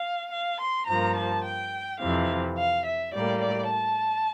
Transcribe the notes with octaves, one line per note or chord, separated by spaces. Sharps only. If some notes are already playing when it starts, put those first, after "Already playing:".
Already playing: F5
F5
C6
G2 F3 A#3 A#5
A5
G5
F2 C3 E3 F5
F5
E5
A2 G3 A#3 D5
D5
A5